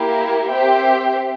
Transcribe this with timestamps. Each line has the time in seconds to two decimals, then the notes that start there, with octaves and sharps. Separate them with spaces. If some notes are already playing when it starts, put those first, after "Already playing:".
Already playing: A#3 E4 G4 A#4
0.50 C4 G4 C5 E5 G5